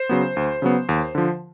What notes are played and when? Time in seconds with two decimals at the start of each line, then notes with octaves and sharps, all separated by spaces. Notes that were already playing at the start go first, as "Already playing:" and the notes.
Already playing: C5
0.09 C#3 F#3 B3
0.37 D2
0.62 C#3 F#3 B3
0.89 D#2
1.15 D3 F3